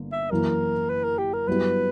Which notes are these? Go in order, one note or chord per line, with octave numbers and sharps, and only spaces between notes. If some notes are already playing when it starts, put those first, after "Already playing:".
Already playing: G1 D3 A#3
E5
F#2 E3 A#3 A#4
B4
A#4
G4
A#4
G2 F#3 B3 E4 G4 B4